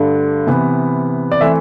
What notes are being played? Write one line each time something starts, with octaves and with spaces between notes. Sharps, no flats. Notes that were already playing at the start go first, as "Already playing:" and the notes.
Already playing: G2 D3 A3 D4
C3 E3 B3
D5
E3 A3 C4 E5